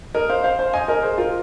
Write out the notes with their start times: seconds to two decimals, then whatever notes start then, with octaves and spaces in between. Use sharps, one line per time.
0.14 A#4 D#5
0.30 C5 F5
0.44 C5 F5
0.59 C5 F5
0.73 D#5 G#5
0.88 A#4 D#5
1.03 G#4 C5
1.18 F4 A#4